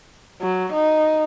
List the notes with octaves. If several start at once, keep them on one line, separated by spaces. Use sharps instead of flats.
F#3
D#4